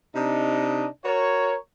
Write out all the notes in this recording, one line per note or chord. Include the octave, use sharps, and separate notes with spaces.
C3 D4 D#4
F#4 A#4 C#5